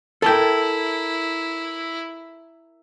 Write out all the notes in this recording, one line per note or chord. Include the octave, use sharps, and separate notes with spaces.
E4 A4 A#4 G5 A5